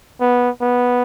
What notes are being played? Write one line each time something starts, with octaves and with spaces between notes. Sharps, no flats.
B3
B3